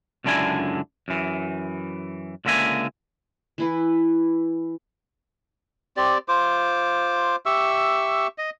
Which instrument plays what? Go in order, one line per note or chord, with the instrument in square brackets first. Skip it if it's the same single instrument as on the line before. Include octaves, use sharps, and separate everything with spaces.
[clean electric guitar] C#2 F#2 D3 D4 E4 G#5
F#2 E3
C#2 D3 A#3 E5 G#5
[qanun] E3 E4 B4
[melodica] C4 G4 D5
F4 C5 D6
G4 E5 C#6 E6
D#5